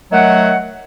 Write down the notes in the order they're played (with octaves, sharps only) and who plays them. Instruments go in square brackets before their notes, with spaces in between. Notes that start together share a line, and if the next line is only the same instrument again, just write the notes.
[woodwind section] D#3 F#3 A3 F#5